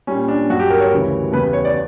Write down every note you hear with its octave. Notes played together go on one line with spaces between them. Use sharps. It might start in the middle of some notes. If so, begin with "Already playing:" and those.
A#2 G3 C#4
D4
G2 F#3 F#4
G4
A#4
C#5
D2 C#3 E3 G3
E2 C#3 G3 B4
B4
C#5
D5